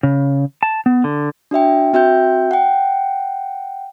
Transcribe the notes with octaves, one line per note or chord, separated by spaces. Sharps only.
C#3
A5
B3
D3
D4 F#4 E5 G5
C4 F#4 E5 G5 G6
F#5 G5